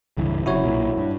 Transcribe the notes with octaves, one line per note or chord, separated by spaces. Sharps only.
C#2 G2 E3
F#1 F#2 C3 E4 F#4 C#5
B1 A#2 A#3
G2